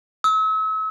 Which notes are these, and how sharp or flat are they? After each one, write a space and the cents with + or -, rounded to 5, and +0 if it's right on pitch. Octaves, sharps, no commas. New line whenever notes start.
E6 -40